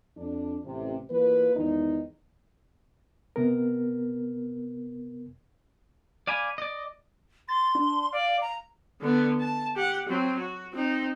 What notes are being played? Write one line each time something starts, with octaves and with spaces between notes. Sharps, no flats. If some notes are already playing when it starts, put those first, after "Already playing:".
F2 D4
A1 C3
E3 A#3 F4 B4
E2 G#2 D#3 D#4
C3 B3 A#4
D5 F5 G#5 B5
D5 D#5
C6 A6
D4
D5 F5
A#5
D3 B3
A5
G4 F#5
F#3 C4
F#4
C4 D#4